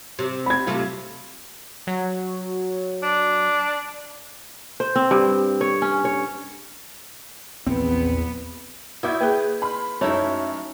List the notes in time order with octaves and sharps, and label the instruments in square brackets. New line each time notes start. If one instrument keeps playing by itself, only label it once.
[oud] C3
[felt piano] B5 G#6
[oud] C3 A3 F4
[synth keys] F#3
[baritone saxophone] D4
[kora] C5
C4
G2
C#5
C#4
C#5
[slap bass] A#1 C4 [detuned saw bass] E2 [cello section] B3
[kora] E4 [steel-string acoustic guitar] F#4 D5 E5 [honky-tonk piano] D#6 G6 G#6
[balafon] A#3 G#4 [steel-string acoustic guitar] B4
[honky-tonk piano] B5 C6 F6
[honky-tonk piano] F#2 E5 [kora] A3 D#4 E4 [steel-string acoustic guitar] C#5